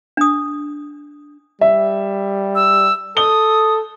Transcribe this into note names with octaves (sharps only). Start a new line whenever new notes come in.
D4 D#6
G3 E5
E6
A4 D#6 G7